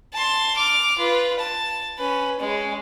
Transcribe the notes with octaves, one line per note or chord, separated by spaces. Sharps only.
A5 C6
D6 F6
F4 B4
A5
C#4 B4
G#3 C#4